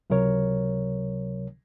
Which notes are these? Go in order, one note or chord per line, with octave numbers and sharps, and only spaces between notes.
C#2 C3 F#3 A#4 C#5